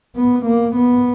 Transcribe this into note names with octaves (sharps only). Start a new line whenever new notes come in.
B3
A#3
B3